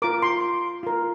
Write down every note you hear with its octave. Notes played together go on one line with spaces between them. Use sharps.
F4 A#4 D6
C6
F4 A#4